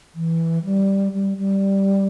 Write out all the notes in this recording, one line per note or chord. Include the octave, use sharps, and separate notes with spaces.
E3
G3
G3
G3